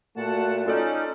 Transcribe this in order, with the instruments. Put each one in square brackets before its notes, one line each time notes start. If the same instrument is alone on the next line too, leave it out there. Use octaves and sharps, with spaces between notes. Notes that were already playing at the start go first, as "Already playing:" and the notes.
[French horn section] A#2 A3 F#4 [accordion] F#5 A5
[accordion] C#4 D#4 [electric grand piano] F4 A4 D5